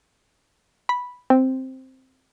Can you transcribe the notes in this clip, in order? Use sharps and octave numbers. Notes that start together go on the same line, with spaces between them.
B5
C4